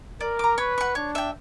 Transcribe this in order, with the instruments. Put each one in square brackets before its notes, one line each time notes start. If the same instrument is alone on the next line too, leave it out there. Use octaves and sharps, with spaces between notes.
[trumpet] A#4 [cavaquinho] D5
[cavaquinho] A#5 D6
[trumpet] B4 [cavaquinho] C#5
[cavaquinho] F#5 C#6
[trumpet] D4 [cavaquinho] C#5
[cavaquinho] E5 G5